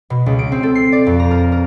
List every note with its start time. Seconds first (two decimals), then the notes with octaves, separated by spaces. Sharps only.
0.10 B2
0.26 C#2
0.39 D7
0.52 C4
0.63 A4
0.75 C7
0.92 D5
1.07 F2
1.20 A#5
1.31 A#4
1.52 A#4